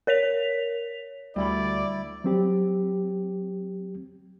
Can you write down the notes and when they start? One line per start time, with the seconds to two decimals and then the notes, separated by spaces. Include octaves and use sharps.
0.07 A#4 C#5 B6 F7
1.36 D2 G3 E4 D5 B5
2.24 F#3 C4 G4